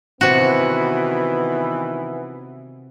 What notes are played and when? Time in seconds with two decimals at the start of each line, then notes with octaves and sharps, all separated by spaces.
0.21 C3 D#3 E3 B3 F#4